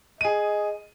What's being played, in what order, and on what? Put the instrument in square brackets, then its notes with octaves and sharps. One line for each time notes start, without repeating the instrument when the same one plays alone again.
[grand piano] G#4 D#7 [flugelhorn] D#5